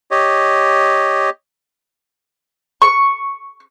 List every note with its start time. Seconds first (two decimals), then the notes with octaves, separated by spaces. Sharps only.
0.11 G4 C#5 D#5
2.82 C#6